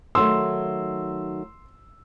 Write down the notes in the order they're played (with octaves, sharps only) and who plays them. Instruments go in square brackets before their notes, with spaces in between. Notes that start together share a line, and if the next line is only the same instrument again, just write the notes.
[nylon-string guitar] D#3 F#3 A3 [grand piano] C6 E6